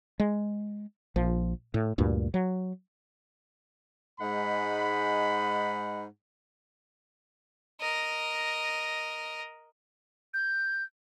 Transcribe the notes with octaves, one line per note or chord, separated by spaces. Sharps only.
G#3
A#1 F3
A2
D2 G2 A#2
F#3
G#2 G#3 D#4 F#5 B5
A#4 D#5
G6